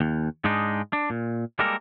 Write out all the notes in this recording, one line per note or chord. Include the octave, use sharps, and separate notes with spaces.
D#2
G#2 G#3 D4 D#4
D4
A#2
G3 G#3 A#3 A4 A#4